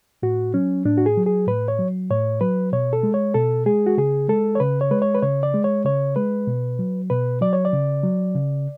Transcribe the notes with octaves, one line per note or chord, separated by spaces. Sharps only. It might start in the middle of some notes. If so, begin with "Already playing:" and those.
A2 F#4
F#3 C#4
A2 D4
F#4
G#4
F#3
G#4
A2 B4
C#5
F#3
A2 C#5
F#3 B4
B2 C#5
A4
G#3
C#5
B2 A4
G#3 G#4
F#4
C#3 G#4
G#3 A4
C#5
C#3 B4
C#5
G#3 B4
C#5
B4
C#3 C#5
D5
G#3
C#5
C#3 C#5
G#3 B4
B2
F#3
B2 B4
F#3 D5
C#5
D5
C#3
F#3
C#3